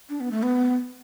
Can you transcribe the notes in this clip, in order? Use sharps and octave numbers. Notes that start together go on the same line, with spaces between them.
D4
B3
A3
B3